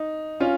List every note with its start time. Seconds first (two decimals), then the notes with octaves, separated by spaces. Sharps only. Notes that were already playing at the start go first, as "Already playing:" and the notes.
Already playing: D#4
0.40 C#4 F4